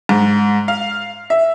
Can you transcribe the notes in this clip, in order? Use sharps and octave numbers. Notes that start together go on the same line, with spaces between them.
G#2
F5
E5